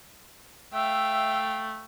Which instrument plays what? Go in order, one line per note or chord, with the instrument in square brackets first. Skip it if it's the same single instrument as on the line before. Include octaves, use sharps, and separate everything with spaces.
[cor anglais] A3 [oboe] E5 [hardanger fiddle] F5 G5